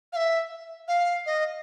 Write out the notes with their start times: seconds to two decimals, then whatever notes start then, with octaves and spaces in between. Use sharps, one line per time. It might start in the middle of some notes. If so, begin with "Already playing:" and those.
0.13 F5
0.16 E5
0.88 F5
1.26 D#5